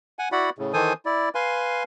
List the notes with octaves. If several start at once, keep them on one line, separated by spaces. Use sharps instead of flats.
F#5 G#5
E4 F#4 D5 F#5 B5
A2 C#3
D#3 E3 A4 C5 G#5 D#6
E4 D5
B4 F5 G#5 C6